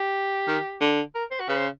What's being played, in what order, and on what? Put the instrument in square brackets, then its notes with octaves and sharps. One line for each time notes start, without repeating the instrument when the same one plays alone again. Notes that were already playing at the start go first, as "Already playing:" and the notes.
Already playing: [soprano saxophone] G4
[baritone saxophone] D#3
D3
[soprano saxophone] A#4
C5
F#4
[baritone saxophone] C#3 [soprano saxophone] B4
[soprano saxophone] C5